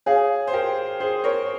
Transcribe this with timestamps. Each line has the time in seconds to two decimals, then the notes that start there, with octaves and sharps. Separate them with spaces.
0.06 G#4 C#5 F5 G#5
0.47 C5
0.53 G4 A#4
1.00 G#4 C5
1.24 A#4 C#5